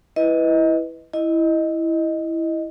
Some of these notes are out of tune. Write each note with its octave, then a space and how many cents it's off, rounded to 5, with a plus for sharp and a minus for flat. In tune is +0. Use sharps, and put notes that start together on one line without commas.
E4 +0 B4 +0 D#5 +20
E4 +0 D#5 +0